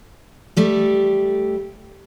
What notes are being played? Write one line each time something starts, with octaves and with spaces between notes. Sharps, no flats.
G3 A3 G4